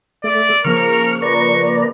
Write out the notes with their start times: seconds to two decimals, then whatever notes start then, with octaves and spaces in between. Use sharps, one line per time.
0.24 A3 D5 E5
0.64 C#3 F3 A#3 A#4 C#6 F6
1.22 B4 D5 A#5 C#6